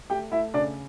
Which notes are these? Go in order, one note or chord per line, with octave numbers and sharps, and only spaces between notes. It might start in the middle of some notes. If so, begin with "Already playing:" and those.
A3 G4 G5
A3 E4 E5
C#3 D4 D5